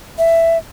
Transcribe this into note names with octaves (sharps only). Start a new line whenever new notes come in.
E5